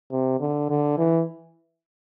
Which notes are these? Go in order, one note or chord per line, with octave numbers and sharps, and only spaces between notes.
C3
D3
D3
E3